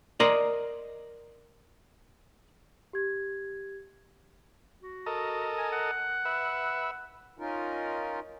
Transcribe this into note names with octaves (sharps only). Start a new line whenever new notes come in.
A#4 D5 D#5 A#5 C6
G4 G#6
F#4
A4 A#4 D#5
G#5
F#5
B4 E5
C#4 D#4 F4 A#4